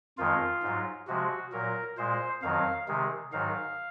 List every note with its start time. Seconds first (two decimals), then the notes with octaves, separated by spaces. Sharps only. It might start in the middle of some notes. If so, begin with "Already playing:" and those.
0.18 F2 D#3 G#3 F4
0.63 G#2 F#3
1.07 C3 F3 G#3 F#4
1.53 A#2 F#3 A#4
1.98 A#2 G#3 C5
2.42 F2 D#3 F#3 F5
2.88 C3 D#3 G#3
3.33 G#2 D#3 F#3 F5